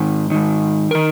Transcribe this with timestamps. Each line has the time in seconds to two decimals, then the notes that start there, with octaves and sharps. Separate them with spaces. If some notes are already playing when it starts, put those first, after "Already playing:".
Already playing: G#2 D#3
0.30 G#2 D#3
0.91 D#3 A#4